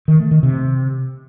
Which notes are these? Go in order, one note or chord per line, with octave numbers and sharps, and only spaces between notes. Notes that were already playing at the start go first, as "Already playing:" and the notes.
D#3
A3
D#3
C3